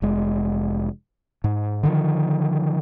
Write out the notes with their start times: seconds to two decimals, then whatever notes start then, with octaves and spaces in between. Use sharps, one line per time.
0.02 F1 G#3
1.44 G#2
1.83 D3 D#3 F3